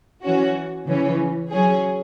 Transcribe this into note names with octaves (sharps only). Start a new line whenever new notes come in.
E3 C#4 F#4
C#3 E3 C#4
F#3 C#4 G#4